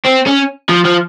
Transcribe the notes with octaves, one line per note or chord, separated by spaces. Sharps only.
C4
C#4
F3
F3